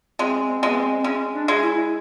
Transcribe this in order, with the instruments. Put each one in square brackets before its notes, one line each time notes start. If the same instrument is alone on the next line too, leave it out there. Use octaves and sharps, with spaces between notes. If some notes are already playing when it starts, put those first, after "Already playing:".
[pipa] G#3 [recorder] C4
[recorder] C4
[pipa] G#3 [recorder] B3
[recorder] C4
C4
[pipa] G#3 [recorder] C#4
[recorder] D4
[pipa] G#3
[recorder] E4